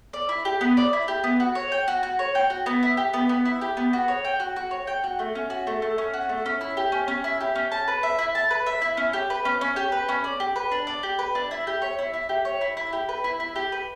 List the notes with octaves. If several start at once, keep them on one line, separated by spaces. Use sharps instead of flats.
D5
E4
G4
B3
D5
E4
G4
B3
F#4
C#5
G5
F#4
F#4
C#5
G5
F#4
B3
E4
G4
B3
B3
E4
G4
B3
F#4
C#5
G5
F#4
F#4
C#5
G5
F#4
A3
C#4
F#4
A3
A3
C#4
F#4
A3
C#4
E4
G4
C#4
C#4
E4
G4
C#4
A5
B4
E5
E4
A5
B4
E5
E4
C#4
G4
B4
C#4
C#4
G4
B4
C#4
D5
G4
B4
D4
D5
G4
B4
D4
E4
G4
C#5
E4
E4
G4
C#5
E4
E4
G4
B4
E4
E4
G4
B4